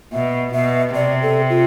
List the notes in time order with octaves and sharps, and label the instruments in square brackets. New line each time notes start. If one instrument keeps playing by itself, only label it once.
[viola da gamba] B2 [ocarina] E5
[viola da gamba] B2 [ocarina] E5
[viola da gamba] C3 [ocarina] D5
[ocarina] A4
F4